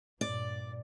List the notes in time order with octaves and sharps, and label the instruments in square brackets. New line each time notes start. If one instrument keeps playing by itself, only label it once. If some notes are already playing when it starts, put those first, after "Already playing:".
[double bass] G2 A#2 [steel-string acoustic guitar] D5